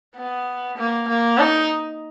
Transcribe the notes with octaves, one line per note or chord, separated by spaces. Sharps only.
B3
A#3
A#3
D#4